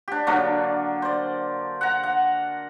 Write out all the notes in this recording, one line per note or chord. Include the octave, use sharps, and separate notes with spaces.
D4 G4
D3 F#3 A#3 D4
C5 D5
F#5 A#5
F#5